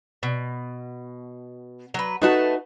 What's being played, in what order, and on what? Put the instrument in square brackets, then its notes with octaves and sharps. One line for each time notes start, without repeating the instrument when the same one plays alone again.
[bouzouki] B2
F#3 B4
[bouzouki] A3 B4 A5 [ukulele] D#4 F#4